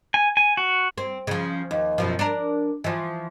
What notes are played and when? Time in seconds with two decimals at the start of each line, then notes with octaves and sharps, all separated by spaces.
0.14 G#5
0.37 G#5
0.57 F#4
0.98 C4
1.27 C#3 F3
1.71 D#2
1.98 F#2 B2 F3
2.19 D4 A#4
2.84 E3 F3